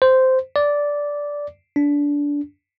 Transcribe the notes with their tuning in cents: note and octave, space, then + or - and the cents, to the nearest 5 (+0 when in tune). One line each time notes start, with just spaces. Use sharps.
C5 -10
D5 -10
D4 -20